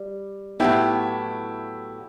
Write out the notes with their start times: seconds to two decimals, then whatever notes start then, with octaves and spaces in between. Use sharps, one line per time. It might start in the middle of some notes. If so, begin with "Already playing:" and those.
Already playing: G3
0.60 A2 F#3 B3 E4 G4